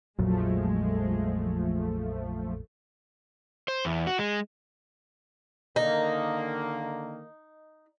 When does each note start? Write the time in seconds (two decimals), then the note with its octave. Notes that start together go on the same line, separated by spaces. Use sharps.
0.19 A#1 F2 A#2 F3 F#3 G#3 A3
3.68 C5
3.85 E2
4.07 F#4
4.19 G#3
5.76 D3 D#3 A#3 D#4